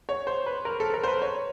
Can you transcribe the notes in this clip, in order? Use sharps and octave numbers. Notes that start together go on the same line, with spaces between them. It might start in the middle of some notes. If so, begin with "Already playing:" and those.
C#5
C5
B4
A#4
A4
A4
A#4
C5
B4
C#5